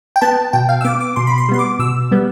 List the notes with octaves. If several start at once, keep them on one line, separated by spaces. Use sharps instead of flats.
G5
B3 A5
B2 G5
F5
E6
B3 D6
D6
B2 C6
B5
C6
G3 B3 C6
D6
B2 E6
G3 B3